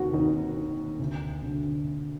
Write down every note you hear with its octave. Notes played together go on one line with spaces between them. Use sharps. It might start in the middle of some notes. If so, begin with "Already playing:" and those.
Already playing: D#2 D#3 F#4
D#2 D#4
D#3
D2
D3